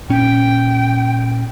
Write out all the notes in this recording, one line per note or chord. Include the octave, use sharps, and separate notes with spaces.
A#2 C#4 G5